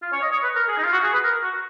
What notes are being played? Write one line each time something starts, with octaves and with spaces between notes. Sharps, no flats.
F4
C#5
D#5
C#5
B4
A#4
G#4
D#4
F4
F#4
G#4
B4
A#4
F#4